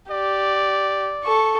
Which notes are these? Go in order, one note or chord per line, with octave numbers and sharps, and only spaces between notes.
G4 D5
A4 C#6